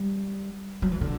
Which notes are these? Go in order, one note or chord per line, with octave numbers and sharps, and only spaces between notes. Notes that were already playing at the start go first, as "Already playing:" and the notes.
Already playing: G3
F#3
E3
D3